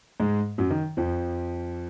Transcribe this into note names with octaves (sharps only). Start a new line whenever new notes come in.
G#2 G#3
F#2 F#3
D#3
F2 F3